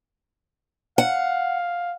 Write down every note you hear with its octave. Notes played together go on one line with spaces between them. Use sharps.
F5 F#5